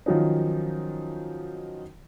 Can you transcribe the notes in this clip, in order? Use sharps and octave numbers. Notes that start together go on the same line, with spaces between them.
D#3 F3 F#3 C#4 D#4